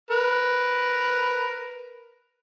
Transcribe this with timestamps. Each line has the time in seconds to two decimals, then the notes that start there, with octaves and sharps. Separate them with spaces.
0.10 A#4 B4